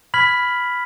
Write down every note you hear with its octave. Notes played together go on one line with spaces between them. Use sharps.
B5 F6 G#6 B6 F#7